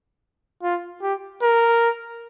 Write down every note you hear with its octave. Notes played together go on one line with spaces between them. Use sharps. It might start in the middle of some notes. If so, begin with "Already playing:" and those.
F4
G4
A#4